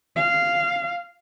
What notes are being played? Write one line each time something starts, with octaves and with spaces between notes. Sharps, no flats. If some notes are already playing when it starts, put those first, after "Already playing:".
F5